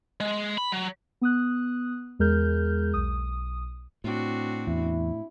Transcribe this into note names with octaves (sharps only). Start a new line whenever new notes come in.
G#3
B5
F#3
B3 D#6 F#6
E2 G#3 G#4 A#4 F6 G6
B1 D#6
A2 C4 D4 F#4
E2 E4